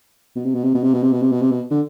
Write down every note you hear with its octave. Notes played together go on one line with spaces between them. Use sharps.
B2
C3
B2
C3
B2
C3
B2
C3
B2
C3
B2
C3
B2
D3